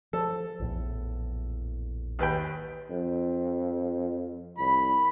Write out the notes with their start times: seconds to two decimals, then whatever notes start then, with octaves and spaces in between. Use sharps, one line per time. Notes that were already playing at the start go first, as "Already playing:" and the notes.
0.13 F3 A4
0.60 A#1 E2 A2
2.19 D#2 B4 G5
2.90 F2
4.58 C2 B5